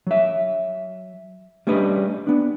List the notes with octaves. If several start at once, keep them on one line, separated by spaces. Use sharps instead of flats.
F#3 E5
G3 A3 C#4 D4 B4 D#5
B3 D4